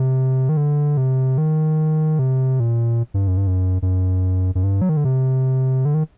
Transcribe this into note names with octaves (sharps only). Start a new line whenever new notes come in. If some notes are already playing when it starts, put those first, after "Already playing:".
Already playing: C3
D#3
D3
C3
D#3
C3
A#2
G2
F#2
G2
F#2
F#2
F#2
G2
F#3
D#3
D3
C3
D3
D#3